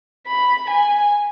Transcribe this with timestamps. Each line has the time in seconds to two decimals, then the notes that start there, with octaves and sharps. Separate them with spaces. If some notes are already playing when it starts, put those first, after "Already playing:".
0.27 B5
0.70 G#5